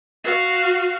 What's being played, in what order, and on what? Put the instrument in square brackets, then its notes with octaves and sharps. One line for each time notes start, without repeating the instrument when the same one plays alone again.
[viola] F#4 F5